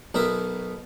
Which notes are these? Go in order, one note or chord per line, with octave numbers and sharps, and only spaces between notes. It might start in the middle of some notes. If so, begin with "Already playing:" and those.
B1 B2 B3 A#4 E5